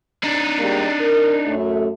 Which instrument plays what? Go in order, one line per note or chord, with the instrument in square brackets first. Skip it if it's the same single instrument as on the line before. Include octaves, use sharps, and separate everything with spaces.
[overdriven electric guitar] D4 D#4
[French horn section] G3 G#3 A#3
A#4
F#2 A3